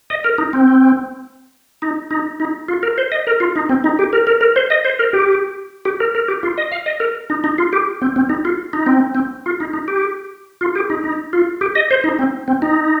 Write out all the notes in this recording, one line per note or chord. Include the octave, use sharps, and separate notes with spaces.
D#5
A#4
D#4
C4
D#4
D#4
D#4
F4
A#4
C5
D#5
A#4
F4
D#4
C4
D#4
G4
A#4
A#4
A#4
C5
D#5
C5
A#4
G4
G4
A#4
A#4
G4
F4
D#5
F5
D#5
A#4
D#4
D#4
F4
G4
C4
C4
D#4
F4
D#4
C4
C4
F4
D#4
D#4
G4
F4
G4
D#4
D#4
F4
G4
D#5
C5
D#4
C4
C4
D#4